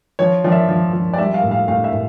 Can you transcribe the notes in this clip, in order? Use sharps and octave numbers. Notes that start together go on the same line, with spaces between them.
F3 C#5
F3 D5
E5
F3
F3
D5
G3 E5
F5
A2
F5
A2 F5
E5
A2